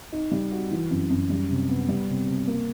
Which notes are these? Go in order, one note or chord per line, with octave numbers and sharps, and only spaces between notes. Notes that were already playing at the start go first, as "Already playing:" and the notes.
D#4
G3
F#4
E3
F#2
F#2
G3
C3
B3
G3
C3
C3
A#3